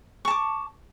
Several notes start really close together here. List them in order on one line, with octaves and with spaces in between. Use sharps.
C#6 A5 D6